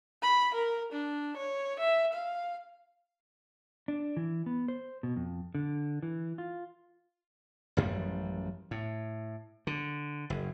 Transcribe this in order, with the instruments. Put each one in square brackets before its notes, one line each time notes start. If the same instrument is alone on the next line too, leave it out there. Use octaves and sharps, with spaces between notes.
[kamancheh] B5
A#4
D4
C#5
E5
F5
[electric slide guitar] D4
E3
B3
C5
B2
F2
D3
E3
F4
[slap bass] A1 F#2 F3 G3
A2
D3
F#1